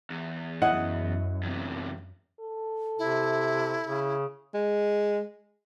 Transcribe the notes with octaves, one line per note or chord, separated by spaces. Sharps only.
E2
F#2 E4 D#5 F#5
E2 C3
A4
C3 E4
C#3
G#3